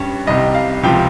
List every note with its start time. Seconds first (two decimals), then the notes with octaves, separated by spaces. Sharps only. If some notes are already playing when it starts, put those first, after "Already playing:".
Already playing: G2 G3 C#4
0.27 C2 C3 G3 D#5
0.55 F5
0.83 C#2 C3 F3 G5